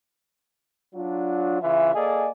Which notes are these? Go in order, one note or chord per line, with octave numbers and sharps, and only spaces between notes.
F#3 D4 F4
C#3 E3 F4 E5
A#3 G#4 A4 D5 D#5 G#5